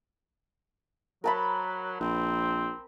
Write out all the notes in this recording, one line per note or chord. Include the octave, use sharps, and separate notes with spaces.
F#3 A#4 A5 B5
A#1 C4